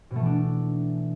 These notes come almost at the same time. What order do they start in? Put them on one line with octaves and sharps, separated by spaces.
B2 A3 E3 D4